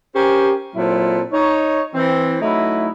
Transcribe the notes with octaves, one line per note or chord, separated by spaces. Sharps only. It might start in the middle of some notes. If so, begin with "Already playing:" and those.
C#4 G4 A#4 C5 G5
A#2 F#3 C4 E4 A4
D#4 C#5
E3 C4
F#3 A3 D#4 E4